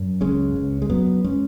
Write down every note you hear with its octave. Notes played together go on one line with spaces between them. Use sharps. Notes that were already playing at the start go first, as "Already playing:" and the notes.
Already playing: F#2
C#2 G#3 C#4
C#2
G#3
F#2 F#3 B3
G#3 C#4